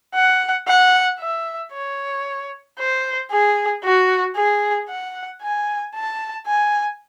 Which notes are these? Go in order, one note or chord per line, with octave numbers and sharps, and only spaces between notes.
F#5
F#5
E5
C#5
C5
G#4
F#4
G#4
F#5
G#5
A5
G#5